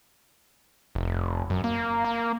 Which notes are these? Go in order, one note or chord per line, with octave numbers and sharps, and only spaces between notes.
F1
F#2
A#3
A#3